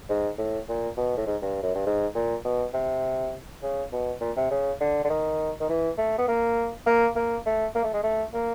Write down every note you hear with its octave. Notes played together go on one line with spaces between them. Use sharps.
G#2
A2
A#2
B2
A2
G#2
G2
F#2
G2
G#2
A#2
B2
C3
C#3
B2
A#2
C3
C#3
D3
D3
D#3
D#3
E3
A3
B3
A#3
A#3
A#3
A3
A#3
A3
G#3
A3
A#3